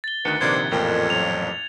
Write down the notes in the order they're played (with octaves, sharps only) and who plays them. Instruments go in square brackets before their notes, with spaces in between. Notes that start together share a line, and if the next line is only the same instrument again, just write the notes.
[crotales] A6 G7
[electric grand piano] D2 D#3 F#6 [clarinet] B4 [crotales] C#7
[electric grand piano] A#1 C3 D#3 [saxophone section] A#3 D4 C5 [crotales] G#6
[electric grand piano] A1 A#2 G5 [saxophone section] F2 [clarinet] A#4
[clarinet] F#3 [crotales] F7